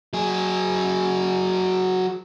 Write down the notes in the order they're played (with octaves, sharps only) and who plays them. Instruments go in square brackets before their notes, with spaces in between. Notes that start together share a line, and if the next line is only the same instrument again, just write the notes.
[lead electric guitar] F#3 G#4